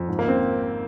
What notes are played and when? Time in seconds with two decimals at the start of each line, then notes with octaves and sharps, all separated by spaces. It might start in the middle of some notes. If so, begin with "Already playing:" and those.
Already playing: F2
0.09 G#2
0.19 G#1 A#3
0.28 C4